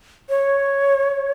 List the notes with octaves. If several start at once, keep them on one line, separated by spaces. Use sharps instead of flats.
C#5